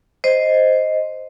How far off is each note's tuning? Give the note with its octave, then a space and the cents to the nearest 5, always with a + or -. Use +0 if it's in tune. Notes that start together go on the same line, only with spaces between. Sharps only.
C5 +0 D#5 +0